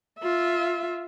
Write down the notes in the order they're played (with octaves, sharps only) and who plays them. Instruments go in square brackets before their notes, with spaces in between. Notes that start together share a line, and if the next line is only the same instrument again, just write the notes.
[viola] F4 E5